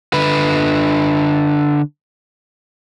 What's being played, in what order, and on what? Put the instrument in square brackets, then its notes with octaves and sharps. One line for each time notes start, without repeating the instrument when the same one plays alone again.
[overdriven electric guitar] D3 B4